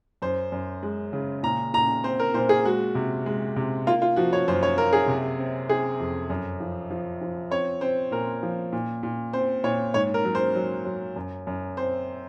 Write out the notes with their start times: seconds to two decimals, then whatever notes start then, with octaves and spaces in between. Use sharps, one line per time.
0.22 F#2 C5
0.52 F#2
0.83 G#3
1.13 C#3
1.43 A#2 A#5
1.73 A#2 A#5
2.04 C4 C5
2.20 A#4
2.34 A#2 C5
2.49 G#4
2.65 G#3 F#4
2.95 C3
3.26 G#3
3.56 C3
3.87 A#3 F4
4.02 F4
4.16 F3 F#4
4.33 C#5
4.48 F#2 C5
4.63 C#5
4.77 A#3 A#4
4.93 G#4
5.08 C3
5.39 C4
5.69 C4 G#4
6.00 F2
6.30 F#2
6.60 F3
6.90 F3
7.21 F3
7.51 C4 C#5
7.81 C4 C5
8.11 A#2 A#4
8.43 F3
8.73 A#2
9.03 A#2
9.33 C4 C5
9.64 A#2 C#5
9.94 G#2 C#5
10.14 A#4
10.25 F#3
10.35 C5
10.55 F#3
10.85 F#3
11.16 F#2
11.47 F#2
11.77 C4 C5